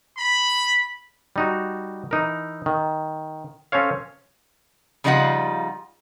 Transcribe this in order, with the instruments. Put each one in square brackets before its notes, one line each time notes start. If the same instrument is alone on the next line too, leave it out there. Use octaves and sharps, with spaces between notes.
[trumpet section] B5
[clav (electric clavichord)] G3 D#4 F#4
E3 D#4 A#4
D#3
C#4 A4 C5 C#5 F5
[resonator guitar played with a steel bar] C#3 F3 G3 D#4 F4 F#5